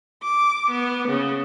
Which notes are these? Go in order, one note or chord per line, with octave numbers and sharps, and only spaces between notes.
D6
B3
C#3